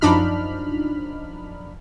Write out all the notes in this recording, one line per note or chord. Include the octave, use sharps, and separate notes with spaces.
F#2 F3 D4 D#4 B5 F6